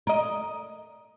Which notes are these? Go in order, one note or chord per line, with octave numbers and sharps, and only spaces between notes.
A#4 D#5